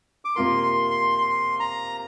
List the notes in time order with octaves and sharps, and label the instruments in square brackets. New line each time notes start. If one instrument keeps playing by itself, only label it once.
[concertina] D6
[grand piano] C3 A#3 F4 A#4 [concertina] C6
[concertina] C6
C6
C6
A#5